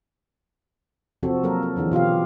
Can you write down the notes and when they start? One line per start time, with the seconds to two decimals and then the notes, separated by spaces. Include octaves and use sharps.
1.23 C3 F3 C4 F#4 A4
1.43 F#3 A#3 A4 A#4
1.63 A4
1.76 D3 E3 D4 G#4
1.92 B2 F4 G4 F5